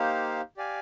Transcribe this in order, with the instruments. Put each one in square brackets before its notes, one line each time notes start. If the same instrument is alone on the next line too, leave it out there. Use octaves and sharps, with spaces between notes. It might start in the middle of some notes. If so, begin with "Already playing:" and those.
Already playing: [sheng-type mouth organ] A#3 D#4 G4 C5 F5
G4 D5 F5 G#5